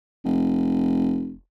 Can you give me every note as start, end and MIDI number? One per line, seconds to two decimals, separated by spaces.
0.24 1.35 29